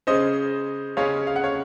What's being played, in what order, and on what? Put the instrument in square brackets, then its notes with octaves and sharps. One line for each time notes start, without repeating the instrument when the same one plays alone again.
[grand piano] C#3 G#3 C#4 C5 D#5
C#3 G#3 C#4 C#5 F5
F5
F#5
C#5 F5